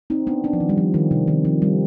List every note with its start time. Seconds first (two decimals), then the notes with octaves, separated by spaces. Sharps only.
0.10 C4 D#4
0.27 B3 D4
0.44 B3 D4
0.53 F3
0.60 D#3
0.69 G3
0.78 F3
0.94 D#3
1.11 C3
1.28 D#3
1.45 F3
1.62 G3